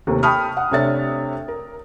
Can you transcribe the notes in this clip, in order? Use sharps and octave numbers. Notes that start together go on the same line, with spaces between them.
D#2 C3 A3 A#3
G5 A5 B5 C#6 D#6 F6
F#5
C3 A3 D4 C#5 E5 A6
A#4